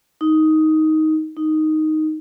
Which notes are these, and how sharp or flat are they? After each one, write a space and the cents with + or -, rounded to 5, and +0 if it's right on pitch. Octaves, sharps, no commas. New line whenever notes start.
D#4 +10
D#4 +0